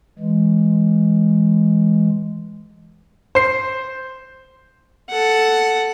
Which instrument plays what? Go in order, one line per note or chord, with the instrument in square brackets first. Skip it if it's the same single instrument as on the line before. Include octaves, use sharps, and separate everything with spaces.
[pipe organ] E3 G#3
[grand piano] C5 C7
[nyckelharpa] A4 F#5